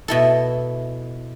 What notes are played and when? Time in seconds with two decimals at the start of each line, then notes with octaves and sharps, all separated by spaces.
0.08 B2 E4 A4